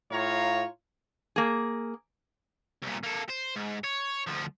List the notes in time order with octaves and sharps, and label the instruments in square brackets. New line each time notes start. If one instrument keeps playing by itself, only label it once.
[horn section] A2 F4 C#5 F5 A#5
[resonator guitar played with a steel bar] A#3 G#4
[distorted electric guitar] C2 A#2
A#3 A4
C5
G#2
C#5
D2 F3